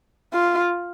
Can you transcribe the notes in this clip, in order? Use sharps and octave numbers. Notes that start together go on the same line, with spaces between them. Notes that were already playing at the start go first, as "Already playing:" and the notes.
F4